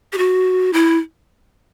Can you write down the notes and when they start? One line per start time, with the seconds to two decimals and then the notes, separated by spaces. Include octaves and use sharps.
0.13 G4
0.18 F#4
0.73 E4